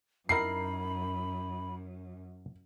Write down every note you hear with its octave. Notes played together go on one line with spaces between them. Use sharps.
F#2 D#4 E4 A#4 B5 C7